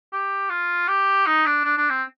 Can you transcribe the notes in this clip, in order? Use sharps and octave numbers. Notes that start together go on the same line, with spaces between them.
G4
F4
G4
D#4
D4
D4
D4
C4